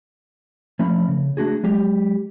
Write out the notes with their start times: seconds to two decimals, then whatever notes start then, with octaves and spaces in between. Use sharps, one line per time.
0.79 F3 A3 C#4 B5
1.08 C#3
1.37 A3 D4 F#4 G#4
1.64 F#3 G#3 G4